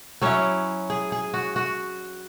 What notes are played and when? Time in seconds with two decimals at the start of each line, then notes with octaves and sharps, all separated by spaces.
0.22 F#3 C#4 E4 C#5
0.90 G#4
1.12 G#4
1.34 F#4
1.56 F#4